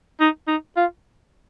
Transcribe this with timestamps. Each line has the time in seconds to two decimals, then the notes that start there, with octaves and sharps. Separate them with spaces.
0.20 D#4
0.48 D#4
0.77 F4